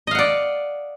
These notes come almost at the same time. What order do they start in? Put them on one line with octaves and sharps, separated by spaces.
D#5 F5 F#5 D5